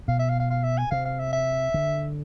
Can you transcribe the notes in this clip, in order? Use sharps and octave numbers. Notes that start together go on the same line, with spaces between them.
B2 F5
E5
F5
F5
F5
E5
G#5
C3 F5
F5
E5
E5
D3